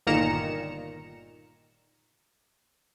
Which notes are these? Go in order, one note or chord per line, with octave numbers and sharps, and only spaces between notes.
G1 A#2 D#3 A#5 C#7 E7